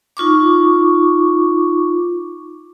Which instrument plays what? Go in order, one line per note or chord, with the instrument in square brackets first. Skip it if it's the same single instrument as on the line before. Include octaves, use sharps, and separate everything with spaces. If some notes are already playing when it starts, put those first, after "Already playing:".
[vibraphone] D#4 F4 C#6 D6